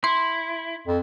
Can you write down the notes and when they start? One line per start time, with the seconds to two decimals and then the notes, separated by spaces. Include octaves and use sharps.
0.04 E4 C6
0.87 F2